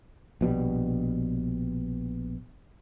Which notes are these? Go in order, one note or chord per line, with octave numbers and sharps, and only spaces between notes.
A#1 B2 F3 G3